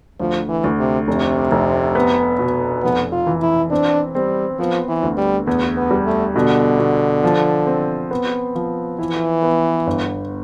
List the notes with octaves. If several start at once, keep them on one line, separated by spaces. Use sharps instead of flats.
D2 F3
E3
D2
C3
F1 C3
F1
B3
B2
F1 B3
F4
E3
E4
C4 D4
G3 C4
F3 B3
E3
D2
G3
E2 B3
B3
G3
A3
B2 D3
B2
F3
C4
B3
F3
E3 E4
B3
G1